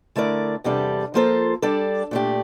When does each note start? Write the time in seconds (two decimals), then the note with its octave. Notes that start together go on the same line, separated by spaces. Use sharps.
0.16 D3 A3 E4 A#4 D5
0.64 E2 C3 G3 D4 A4
1.14 F3 A#3 F4 A4 C5
1.62 G3 D4 A4 D5
2.11 A#2 A3 D4 G4